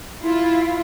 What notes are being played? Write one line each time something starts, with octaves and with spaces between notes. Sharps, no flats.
E4 F4